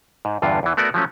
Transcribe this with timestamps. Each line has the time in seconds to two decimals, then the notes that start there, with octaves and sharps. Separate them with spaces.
0.25 G#2
0.42 E2 G2 D3 F4
0.63 E2 E3
0.77 A3 B3 F#4 A#4 D5
0.94 F3 F#3 A3 C#4